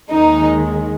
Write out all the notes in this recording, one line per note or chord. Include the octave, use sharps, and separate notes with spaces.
D#2 D#3 G#3 D#4